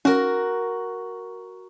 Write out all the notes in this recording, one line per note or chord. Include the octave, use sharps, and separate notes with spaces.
C#4 F#4 A#4